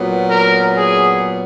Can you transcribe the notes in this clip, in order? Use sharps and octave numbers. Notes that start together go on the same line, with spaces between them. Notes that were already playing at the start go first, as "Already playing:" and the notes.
Already playing: A#2 F#3 B3
A#4
G#4